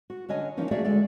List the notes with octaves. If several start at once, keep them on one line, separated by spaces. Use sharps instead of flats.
F#4
D3 C#4 C#5 D#5 G#5
E3 F3 A#3 C#4 D#4
A3 A#3 F#4 G#4 D5 E5
D2 G#3 A4 D5